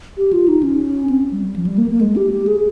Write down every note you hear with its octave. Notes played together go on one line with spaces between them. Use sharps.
G4
F4
D#4
C#4
C4
G3
G3
F3
G3
A#3
A#3
G#3
G4
G4
G#4